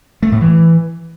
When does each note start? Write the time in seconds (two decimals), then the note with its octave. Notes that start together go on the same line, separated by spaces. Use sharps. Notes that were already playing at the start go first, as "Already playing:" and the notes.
0.23 A3
0.32 A2
0.41 E3